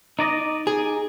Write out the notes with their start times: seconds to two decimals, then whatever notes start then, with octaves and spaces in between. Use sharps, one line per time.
0.19 D#4 D5 D#5
0.67 G#4